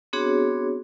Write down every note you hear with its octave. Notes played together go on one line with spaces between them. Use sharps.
B3 C4 D4 F#4 G#4 C#5